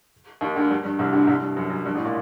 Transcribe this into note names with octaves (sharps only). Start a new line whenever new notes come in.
D#2 D#3
D2 D3
G2
G2
C2 C3
D2 D3
C2 C3
G2
F#2
F#2
G2
A1 A2
A#2